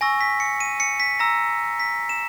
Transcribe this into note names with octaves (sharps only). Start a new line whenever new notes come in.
G#5 C#6 E6 A#6
B6
C#7
D#7
C#7
B6
A#5 E6 A#6
B6
E7